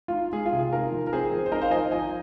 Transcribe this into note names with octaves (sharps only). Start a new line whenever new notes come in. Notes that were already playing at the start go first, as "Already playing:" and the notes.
D#4 F4
G#3 G#4
F4
C3
G#4
D#4 F4 A#4
F3
A#4
C4 G#4 C5
F3
C5
D#4 A#4 D#5
C5 F5
F3 D#5 G#5
F3 D#5 G#5